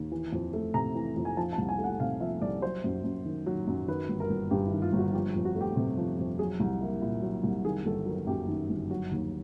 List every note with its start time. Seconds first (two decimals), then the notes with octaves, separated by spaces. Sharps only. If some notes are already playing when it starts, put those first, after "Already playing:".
Already playing: D#2
0.12 E3
0.32 F2
0.53 A3
0.74 C3 A#5
0.95 E3
1.16 F2
1.25 G#5
1.37 F3 A5
1.53 A5
1.58 C2
1.69 G#5
1.79 A3
1.84 F#5
2.00 C3 F5
2.21 F3 E5
2.42 C2 D5
2.62 F#3 C5
2.84 F#2
3.04 F#2
3.25 D#3
3.46 F#3
3.68 F#2
3.88 D#3 B4
4.09 G1
4.20 A#4
4.30 G1
4.51 G2 G4
4.66 E4
4.72 D#3
4.82 F4
4.93 G1
4.98 F#4
5.13 F3 G4
5.29 G4
5.35 F2
5.45 F#4
5.55 A3
5.61 G4
5.76 C3
5.97 F3
6.19 F2
6.39 F#3 G#4
6.60 C2
6.81 A#3 E4
7.02 A#2 E4
7.22 F#3
7.44 C2
7.65 D#3 G#4
7.85 G1 A4
8.06 F#3 A#4
8.27 F#2 G4
8.48 D#3
8.70 G1
8.90 F#3 F#4
9.11 D#2